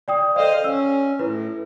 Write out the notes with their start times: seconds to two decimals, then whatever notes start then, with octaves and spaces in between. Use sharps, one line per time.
0.08 D5 G5 D#6
0.36 A4 C5 D5 D#5 F5
0.64 C#4 E6
1.19 A2 E4 B4